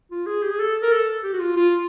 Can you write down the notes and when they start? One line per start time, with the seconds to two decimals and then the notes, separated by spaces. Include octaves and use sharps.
0.11 F4
0.26 G#4
0.42 G4
0.51 G#4
0.60 A4
0.82 A#4
0.92 A4
1.23 G4
1.33 F#4
1.40 F4
1.56 F4